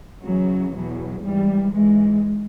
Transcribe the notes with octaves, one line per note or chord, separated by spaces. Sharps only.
F#2 C#3 E3 F#3
E2 B2 F#3
G#2 E3 G3
G#2 E3 G#3